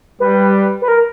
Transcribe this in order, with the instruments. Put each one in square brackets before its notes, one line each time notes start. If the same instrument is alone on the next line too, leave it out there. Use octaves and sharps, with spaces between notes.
[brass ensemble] G3 [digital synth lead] B4
[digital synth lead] B4
A#4